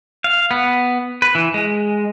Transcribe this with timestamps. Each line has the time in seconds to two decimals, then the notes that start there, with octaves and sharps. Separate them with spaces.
0.24 F5
0.51 B3
1.22 B4
1.35 E3
1.54 G#3